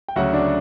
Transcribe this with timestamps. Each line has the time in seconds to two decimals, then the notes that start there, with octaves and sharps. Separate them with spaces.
0.08 G5
0.16 D2 C#3 F#3 F#4 F#5
0.33 D4 D5